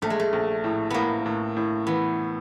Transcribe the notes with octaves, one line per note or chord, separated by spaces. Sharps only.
A#1 A3
G#3
A3
A#1
A2
A2 A#3 B3
A2
A2
E3 B3